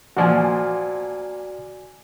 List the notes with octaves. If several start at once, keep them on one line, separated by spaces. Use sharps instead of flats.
A#2 F3 F#4 D5 G#5